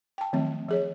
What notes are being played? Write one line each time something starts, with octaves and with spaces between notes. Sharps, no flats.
G5 A5
D#3 F3 F#3 A3 C4
F3 G#4 C#5